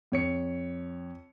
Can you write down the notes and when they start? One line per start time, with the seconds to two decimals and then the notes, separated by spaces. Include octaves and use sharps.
0.12 F2 C#5 C#7